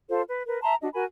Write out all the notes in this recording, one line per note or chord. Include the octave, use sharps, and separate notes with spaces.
F4 A4 C5
B4
A#4 B4
E5 A5 A#5 C6
D4 F#4 D#5
F#4 A#4 G#5 B5